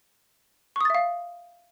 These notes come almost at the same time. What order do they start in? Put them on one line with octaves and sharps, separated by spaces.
C#6 D#6 A6 E5 F5